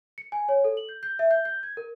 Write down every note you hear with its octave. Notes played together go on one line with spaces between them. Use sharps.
C#7
G#5
C#5
A4
F#7
G6
G6
E5
G6
G6
G#6
A#4